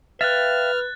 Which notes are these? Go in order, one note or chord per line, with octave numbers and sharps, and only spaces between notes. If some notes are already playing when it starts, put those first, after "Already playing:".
B4 E5 F5 G5 F6 F#6 A6